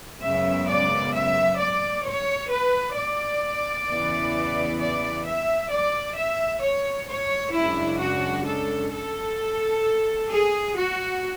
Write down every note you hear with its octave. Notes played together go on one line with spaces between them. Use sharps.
F#2 C#3 G#3 B3 E5
D5
E5
D5
C#5
B4
D5
E2 C#3 E3 B3 E4
D5
E5
D5
E5
C#5
C#5
F#2 C#3 G#3 D4 E4
F#4
A4
A4
G#4
F#4